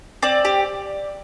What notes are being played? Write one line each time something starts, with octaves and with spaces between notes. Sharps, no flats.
C4 D5
G4